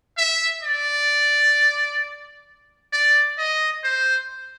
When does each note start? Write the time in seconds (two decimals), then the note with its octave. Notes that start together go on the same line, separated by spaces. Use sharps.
0.17 E5
0.63 D5
2.93 D5
3.38 D#5
3.84 C5